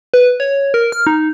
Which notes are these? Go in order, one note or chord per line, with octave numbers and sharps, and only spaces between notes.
B4
C#5
A#4
F6
D#4